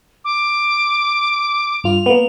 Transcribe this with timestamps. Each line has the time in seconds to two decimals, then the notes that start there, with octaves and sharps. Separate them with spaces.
0.25 D6
1.84 G2 F4 F7
2.06 A#3 B3